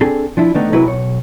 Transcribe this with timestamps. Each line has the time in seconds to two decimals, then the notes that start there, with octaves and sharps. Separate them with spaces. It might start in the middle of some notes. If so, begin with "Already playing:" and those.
0.01 C4 D4 G#4 A4
0.37 F3 D4 E4
0.55 D3 D#3 A3 B3 D#4
0.72 C3 F#3 E4 G#4 A#4 B4
0.85 B1 C#5